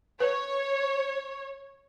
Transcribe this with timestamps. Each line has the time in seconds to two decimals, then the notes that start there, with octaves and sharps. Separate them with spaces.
0.20 B4 C#5